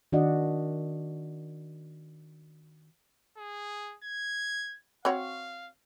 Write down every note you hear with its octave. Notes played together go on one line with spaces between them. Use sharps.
D#3 D4 F#4 D5 D#5 F#5
G#4
G#6
C4 F#4 C#5 F5